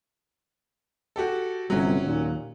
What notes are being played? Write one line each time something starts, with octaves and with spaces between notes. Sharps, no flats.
F#4 G4 A4
G1 F2 C3 F#3 C#4
D#2 A#2